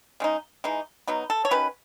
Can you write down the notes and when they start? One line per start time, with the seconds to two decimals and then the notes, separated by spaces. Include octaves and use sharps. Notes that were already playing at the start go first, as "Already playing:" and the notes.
0.20 C#3 G#3 D#4
0.64 E3 G#3 D#4
1.07 B2 F#3 B3 D#4
1.30 A4
1.45 C#5
1.51 D#3 F#3 C#4 B4